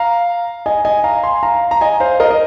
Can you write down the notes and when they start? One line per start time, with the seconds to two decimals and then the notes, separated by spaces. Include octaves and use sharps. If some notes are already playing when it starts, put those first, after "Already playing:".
Already playing: F5 A#5
0.66 D#5 G#5
0.85 D#5 G#5
1.04 F5 A#5
1.23 G#5 C6
1.43 F5 A#5
1.71 A#5
1.81 D#5 G#5
2.00 C5 F5
2.20 A#4 D#5
2.31 D#5